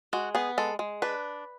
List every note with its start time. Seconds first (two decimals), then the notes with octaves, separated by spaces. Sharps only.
0.13 G#3 F#4
0.35 B3 G#4
0.58 G#3 A4
0.79 G#3
1.02 D4 B4